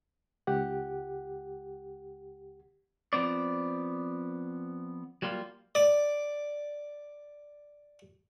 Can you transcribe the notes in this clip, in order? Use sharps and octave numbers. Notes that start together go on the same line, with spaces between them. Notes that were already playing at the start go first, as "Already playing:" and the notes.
C#2 G4 F#5
F3 B3 C4 D5
F#3 G3 A#3 F4
D5 D6